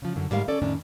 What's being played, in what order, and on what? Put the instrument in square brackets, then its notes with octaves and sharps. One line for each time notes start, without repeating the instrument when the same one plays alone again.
[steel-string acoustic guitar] C#3 F3
F#2 D3
G#2 G3 A3 A#4 F5
C#4 A4 D5
F2 A2 D#3 C#4 D4